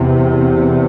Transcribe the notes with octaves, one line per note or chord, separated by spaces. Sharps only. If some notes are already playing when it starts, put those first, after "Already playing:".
Already playing: E2 C3